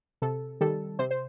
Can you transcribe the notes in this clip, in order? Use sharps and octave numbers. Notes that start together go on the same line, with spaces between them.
C3 A4
D#3 G3 A4
C3 C5
C5